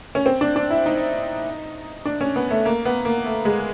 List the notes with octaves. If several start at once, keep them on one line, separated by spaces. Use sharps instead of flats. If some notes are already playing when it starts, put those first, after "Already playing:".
C#4
C4
D4
D4
E4
D#4
D4
C#4
B3
A3
A#3
B3
A#3
A3
G#3